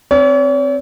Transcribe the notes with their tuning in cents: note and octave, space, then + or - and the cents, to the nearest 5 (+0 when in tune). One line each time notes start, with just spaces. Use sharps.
C4 +0 C#5 +45